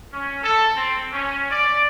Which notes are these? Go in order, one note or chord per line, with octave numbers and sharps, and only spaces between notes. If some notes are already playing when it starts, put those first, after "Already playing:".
C#4
A4
C4
C#4
D5